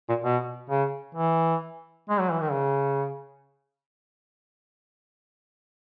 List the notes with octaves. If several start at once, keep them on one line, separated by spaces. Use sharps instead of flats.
A#2
B2
C#3
E3
G#3
F#3
E3
D#3
C#3